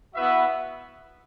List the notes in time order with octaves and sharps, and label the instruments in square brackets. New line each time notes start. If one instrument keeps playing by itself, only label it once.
[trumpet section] B3 E4 B4 E5 [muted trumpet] F#4